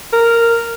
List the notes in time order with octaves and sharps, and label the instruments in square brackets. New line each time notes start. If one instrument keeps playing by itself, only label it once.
[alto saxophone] A#4